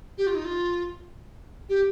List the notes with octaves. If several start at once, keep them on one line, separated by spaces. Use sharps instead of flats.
G4
F4
D#4
F4
G4